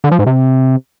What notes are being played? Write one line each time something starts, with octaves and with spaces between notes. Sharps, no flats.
D3
F3
G#2
C3